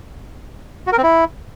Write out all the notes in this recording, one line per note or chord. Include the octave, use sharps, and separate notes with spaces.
F#4
A#4
C4
E4